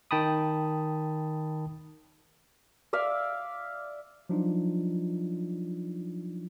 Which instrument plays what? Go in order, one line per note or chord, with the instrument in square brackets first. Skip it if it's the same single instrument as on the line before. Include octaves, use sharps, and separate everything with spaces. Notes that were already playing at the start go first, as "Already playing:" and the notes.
[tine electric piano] D#3 G5 A5 B5 D#6
[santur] D5 E5 F5
[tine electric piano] F3 F#3 D4 D#4 F4